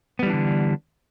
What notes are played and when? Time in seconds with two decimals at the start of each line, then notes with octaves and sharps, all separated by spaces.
0.19 B3
0.23 G3
0.26 E3
0.30 D4
0.33 D3